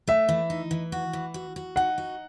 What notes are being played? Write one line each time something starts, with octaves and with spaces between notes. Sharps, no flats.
A3 E5
E3
D#4
E3
F#4
E3
F#4
F#4
D#4 F#5
F#4